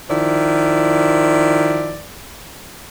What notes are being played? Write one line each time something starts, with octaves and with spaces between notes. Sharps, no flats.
D#3 F3 E4 D5